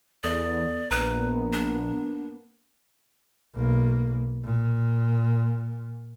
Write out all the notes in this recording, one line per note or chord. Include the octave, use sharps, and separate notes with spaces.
E2 B3 A4 D5 D#6
A#1 A#3 B3 B4 A#5
D4
B1 A#3
A#2